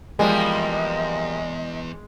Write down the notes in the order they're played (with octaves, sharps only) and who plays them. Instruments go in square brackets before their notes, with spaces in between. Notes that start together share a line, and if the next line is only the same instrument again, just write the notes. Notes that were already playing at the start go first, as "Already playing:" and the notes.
[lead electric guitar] E2 [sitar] F3 G3 A#3 [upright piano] G#3 [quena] D#5